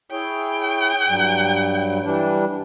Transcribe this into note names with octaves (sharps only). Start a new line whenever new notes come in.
E4 G#4 C#5 G5
G2 F#3 G3
E3 G3 D4